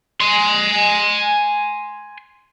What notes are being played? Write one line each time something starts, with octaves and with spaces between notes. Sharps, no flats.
G#5 C6